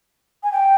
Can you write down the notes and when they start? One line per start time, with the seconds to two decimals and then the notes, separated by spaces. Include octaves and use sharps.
0.43 G#5
0.52 G5